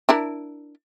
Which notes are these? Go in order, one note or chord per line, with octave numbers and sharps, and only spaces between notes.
D4 E4 A#4